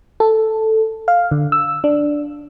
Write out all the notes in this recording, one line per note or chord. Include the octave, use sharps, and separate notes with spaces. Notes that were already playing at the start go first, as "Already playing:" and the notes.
A4
F5
D3
E6
D4